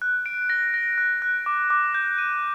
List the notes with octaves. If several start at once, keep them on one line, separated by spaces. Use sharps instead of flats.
F#6
D7
A#6
A#6
F#6
F#6
D6
D6
G6
D#7